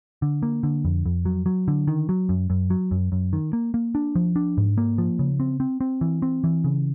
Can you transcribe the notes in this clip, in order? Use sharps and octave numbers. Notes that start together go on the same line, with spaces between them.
D3
A#3
D3
F2
F2
F#3
F#3
D3
D#3
F#3
F#2
F#2
F#3
F#2
F#2
D#3
A#3
A#3
D4
F3
D4
G#2
A#3
F3
C#3
C4
C4
C4
E3
C4
E3
C#3